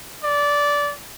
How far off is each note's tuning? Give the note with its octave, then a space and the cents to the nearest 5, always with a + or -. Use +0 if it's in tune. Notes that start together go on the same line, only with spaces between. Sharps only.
D5 -15